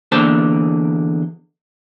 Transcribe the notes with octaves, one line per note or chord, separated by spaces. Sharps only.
E2 D3 A#3 D4 C5 A5